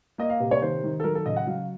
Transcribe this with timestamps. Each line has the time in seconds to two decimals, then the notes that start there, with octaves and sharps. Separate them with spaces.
0.18 A#3 D#5
0.30 F5
0.40 C3
0.51 C#5
0.62 D#3 C5
0.84 D#3
1.00 A4
1.04 F#3 A#4
1.15 A4
1.26 C#3 D#5
1.36 F#5
1.47 F#3 F5